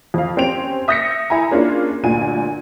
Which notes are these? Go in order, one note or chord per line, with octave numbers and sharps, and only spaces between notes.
F2 F5
C4 C#4 G4 D7 F7
E5 D#6 G6 A#6 B6 C#7
E4 G#5 A#5
A#3 C#4 D4 F4 G#4
G1 D2 A#2 G#5 D#7